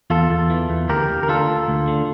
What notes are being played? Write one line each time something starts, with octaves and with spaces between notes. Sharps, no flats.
E2 F4 A4
E2
E3
E2
D2 G4 A#4
D2
A#4
D3 F4 A4
D2
D2
D3